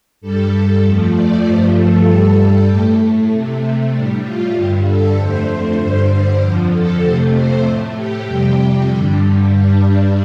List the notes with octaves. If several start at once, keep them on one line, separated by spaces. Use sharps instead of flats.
G2 G3 A4
F2 F3 A3
D5
G2 F3 A3 C5
A4
G2 G3 A4
A2 A3 G4
C3 A3
A2 G3 D4
F4
G2 D3 G3 G4
A4
F2 D3 A3 C5
G2 D3 G3 C5
F2 D3 F3
A4
F2 C3 A3 C5
C5
A2 A3
G4
F2 C3 G3 G4
G2 D3 G3 G4
G2 G3 D4